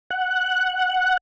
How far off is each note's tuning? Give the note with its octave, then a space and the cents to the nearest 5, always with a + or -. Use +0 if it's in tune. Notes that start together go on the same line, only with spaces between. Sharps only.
F#5 +0